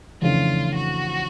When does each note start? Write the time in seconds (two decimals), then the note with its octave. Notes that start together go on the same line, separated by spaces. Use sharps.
0.22 F2 C#3 E3 A3 D4 F4
0.75 F#4